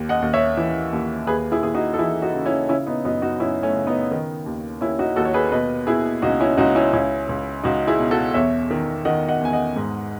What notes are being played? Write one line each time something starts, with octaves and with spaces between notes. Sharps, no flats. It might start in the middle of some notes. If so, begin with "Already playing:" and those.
Already playing: D#2
D#5 F#5
D#2
C#5 E5
E3
D#2
D#2 G#4 B4
E4 G#4
D#2 G#4
D#4 F#4
A4
E3 E4 G#4
D#4 F#4
C#3
C#4 E4
C#3 C#4 E4
B3 D#4
F#2 B3 D#4
D#4 F#4
F#2 C#4 E4
A3 C#4
C#3
B3 D#4
D#3
D#2
D#2 C#4 E4
D#4 F#4
D#2 F#4 A4
C#5
G#4 B4
B2 B4 D#5
B2 E4 G#4
C#2 D#4 F#4
C#4 E4
C#2 D#4 F#4
C#4 E4
C#2 C#4 E4
C#2
C#2 D#4 F#4
E4 G#4
B2
F#4 A4
E2 C#5 E5
D#3
D#3 D#5 F#5
D#5 F#5
E2 G#5
D#5 F#5
G#2